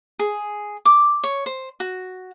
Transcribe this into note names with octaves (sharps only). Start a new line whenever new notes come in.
G#4
D6
C#5
C5
F#4